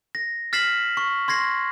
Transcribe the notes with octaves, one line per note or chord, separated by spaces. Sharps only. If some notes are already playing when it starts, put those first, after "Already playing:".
A#6
F6 A6 B6 C7 E7 F#7
C#6
C6 G#6 A#6 C7